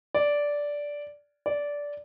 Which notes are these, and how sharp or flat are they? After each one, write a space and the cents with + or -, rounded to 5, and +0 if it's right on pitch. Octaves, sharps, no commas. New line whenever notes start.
D5 -10
D5 -15